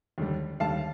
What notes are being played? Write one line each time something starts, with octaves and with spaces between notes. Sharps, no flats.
D#2 D3 G3
D#2 D3 G3 F5 A5